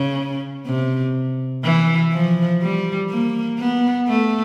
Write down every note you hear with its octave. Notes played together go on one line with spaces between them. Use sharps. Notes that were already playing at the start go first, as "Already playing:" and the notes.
Already playing: C#3
C3
E3
F3
G3
A#3
B3
A3